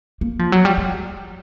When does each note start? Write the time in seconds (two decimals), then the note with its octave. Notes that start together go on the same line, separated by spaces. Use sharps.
0.21 A#3
0.39 F3
0.52 F#3
0.65 G3
0.78 G#3